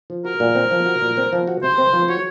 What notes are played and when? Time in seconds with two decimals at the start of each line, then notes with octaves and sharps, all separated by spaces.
0.10 F3
0.25 F#4 A#4
0.40 A#2
0.55 C4
0.71 F3
0.86 F#4
1.01 A#2
1.17 C4
1.33 F3
1.47 F#4
1.63 C3 C5
1.78 C4
1.93 F3
2.08 F#4 C#5